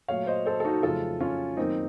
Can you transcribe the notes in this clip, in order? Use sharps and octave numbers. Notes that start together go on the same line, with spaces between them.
A#2 F#3 A3 C#5 F5
C5 D#5
A4 C5
A4
D#4 F#4
F2 C#3 F#3 A3 F4 A4
C#4 F4
F#2 D#3 A#3 C4 D#4